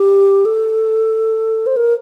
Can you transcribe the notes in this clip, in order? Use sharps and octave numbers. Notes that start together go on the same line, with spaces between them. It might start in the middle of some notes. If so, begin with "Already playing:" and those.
Already playing: G4
A4
C5
A#4